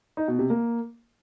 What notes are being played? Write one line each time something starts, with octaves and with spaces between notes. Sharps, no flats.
D#4
B2
C3
A#3